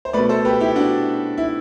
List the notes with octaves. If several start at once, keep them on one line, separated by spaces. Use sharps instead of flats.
C5
B2 A3 B4 D5
A4 C5
G4 B4
E4 G4
D4 F#4
E4